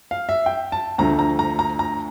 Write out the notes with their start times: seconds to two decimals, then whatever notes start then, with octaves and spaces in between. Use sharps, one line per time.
0.11 F5
0.29 E5
0.46 G5
0.72 A5
0.98 D2 D3 F3 A3 A#5
1.19 A#5
1.39 A#5
1.59 A#5
1.79 A#5